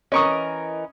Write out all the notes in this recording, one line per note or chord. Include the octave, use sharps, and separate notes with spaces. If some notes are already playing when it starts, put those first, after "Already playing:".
E3 C#4 A#4 D#5 C#6 D#6